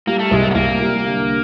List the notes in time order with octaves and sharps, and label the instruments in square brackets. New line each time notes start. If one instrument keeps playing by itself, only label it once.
[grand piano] G3 [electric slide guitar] A#3
[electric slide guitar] A3
[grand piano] C2 [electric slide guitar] G#3
[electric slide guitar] A3
B3
[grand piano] C2 [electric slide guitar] A#3
[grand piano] G3
D3